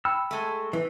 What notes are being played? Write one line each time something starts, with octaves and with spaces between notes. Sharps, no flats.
G5 B5 E6
G#3 A3
E3